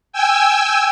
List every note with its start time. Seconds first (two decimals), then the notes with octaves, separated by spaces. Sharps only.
0.13 G5 G#5 E6